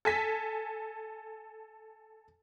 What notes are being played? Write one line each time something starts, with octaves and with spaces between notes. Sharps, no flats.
A4 G#5 B6